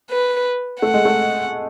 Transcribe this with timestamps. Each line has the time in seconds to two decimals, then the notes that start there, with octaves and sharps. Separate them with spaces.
0.11 B4
0.82 A3 F#5
0.94 G#3
1.05 A3